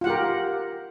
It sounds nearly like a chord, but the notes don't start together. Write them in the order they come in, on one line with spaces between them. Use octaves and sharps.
F4 F#5 G4 A#4